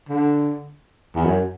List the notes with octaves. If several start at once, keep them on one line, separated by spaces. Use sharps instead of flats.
D3
E2
F#2